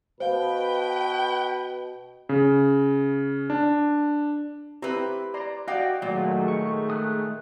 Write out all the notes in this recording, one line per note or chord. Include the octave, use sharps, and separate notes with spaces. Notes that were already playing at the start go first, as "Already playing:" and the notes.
B2 B4 C5 F5 G5
C#3
D4
C4 E4 G4 B4 A#5
D5 A#5 C6
F#4 D5 D#5 F5 G5
A#2 D#3 F#3 G#3 A3
C#6
D#6 F#6